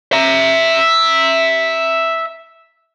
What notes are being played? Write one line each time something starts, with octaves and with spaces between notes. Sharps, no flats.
E5 A#5